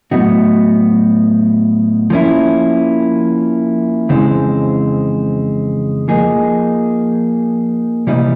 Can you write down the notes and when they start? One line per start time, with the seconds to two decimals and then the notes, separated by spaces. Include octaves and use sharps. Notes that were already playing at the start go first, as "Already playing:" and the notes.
0.11 A2 F#3 B3 D#4 F#4
2.10 F3 A#3 C#4 E4
4.09 F2 C#3 E3 G#3 C4
6.08 F3 A#3 D#4 G#4
8.07 C3 E3 G3 A#3 D#4